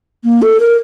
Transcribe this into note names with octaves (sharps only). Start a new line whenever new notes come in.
A#3
A4
A#4